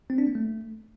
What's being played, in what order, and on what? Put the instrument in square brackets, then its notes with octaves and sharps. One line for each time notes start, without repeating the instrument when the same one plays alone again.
[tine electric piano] C4
D4
A#3
A3